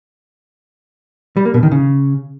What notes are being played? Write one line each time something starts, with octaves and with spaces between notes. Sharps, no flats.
G3
A#3
B2
D#3
C#3